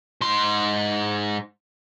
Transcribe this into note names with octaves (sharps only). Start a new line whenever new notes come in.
G#2 C6